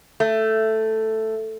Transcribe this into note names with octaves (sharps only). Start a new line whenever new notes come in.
A3